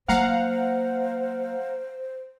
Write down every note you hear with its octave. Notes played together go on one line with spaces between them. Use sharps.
F#3 A#3 C5 F5 F#5 A#5